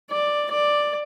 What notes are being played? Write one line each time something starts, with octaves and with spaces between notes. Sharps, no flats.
D5
D5